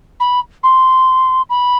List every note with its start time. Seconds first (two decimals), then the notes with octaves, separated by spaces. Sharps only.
0.20 B5
0.63 C6
1.49 B5